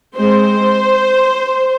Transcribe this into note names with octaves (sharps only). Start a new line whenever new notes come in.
G#3 C4 C5